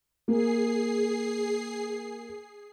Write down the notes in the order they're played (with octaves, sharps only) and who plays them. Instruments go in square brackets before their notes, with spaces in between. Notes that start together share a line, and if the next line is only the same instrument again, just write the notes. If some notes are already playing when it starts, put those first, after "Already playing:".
[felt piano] A#3 [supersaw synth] G#4 C7